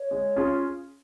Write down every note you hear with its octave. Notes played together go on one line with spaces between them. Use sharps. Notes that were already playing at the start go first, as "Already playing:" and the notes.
Already playing: C#5
G#3
C#4 F4 G#4